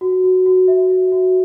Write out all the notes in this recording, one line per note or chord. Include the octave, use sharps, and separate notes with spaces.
F#4
F#4
F#4
E5
F#4
F#4